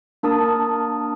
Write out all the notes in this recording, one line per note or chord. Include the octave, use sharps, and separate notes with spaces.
A#3 D4 A#4 A5 D#6